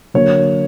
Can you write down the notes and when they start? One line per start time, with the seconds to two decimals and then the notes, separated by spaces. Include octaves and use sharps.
0.14 D3 F#3 A#3 C#5